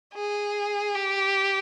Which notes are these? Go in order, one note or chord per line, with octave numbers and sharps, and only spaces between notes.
G#4
G4